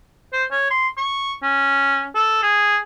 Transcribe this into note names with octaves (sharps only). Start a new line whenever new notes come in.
C5
C#5
C6
C#6
C#4
A4
G#4